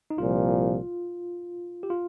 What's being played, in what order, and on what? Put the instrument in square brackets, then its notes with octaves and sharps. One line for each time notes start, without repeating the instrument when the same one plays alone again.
[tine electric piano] D#4
[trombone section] C2 A#2 F3 [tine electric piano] F4
[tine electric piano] G4
F4